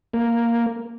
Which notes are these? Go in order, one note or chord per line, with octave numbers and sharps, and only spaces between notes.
A#3